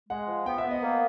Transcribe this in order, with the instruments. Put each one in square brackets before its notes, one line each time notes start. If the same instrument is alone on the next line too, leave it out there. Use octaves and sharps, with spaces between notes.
[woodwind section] G#3 [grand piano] F#5
[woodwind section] F3
[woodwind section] B3 [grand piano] G5
[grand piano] E5
[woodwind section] B3
[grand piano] D#5
[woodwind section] A#3